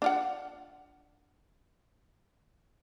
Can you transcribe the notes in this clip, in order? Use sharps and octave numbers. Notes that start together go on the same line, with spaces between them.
D4 F4 F#5